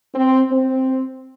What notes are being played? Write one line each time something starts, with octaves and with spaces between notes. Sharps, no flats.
C4
C4